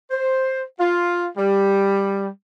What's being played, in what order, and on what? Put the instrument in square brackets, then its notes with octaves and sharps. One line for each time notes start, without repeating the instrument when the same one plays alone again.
[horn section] C5
F4
G3